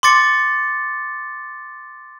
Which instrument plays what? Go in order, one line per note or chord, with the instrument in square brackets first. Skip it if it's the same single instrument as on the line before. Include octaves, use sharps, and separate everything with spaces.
[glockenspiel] C6 D6 A6 C#7